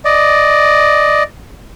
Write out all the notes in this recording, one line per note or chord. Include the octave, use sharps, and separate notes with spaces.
D5 D#5